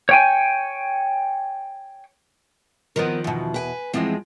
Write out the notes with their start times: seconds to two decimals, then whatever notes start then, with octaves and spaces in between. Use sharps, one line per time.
0.09 C#5 G5 G#5
2.96 D#3 F3 B3 C4 A#4
3.24 E2 B2
3.54 B4 G5 G#5
3.93 E2 E3 F3 G#3 C4